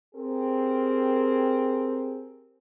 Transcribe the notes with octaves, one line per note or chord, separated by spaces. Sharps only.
C4 G4 G#4 A#4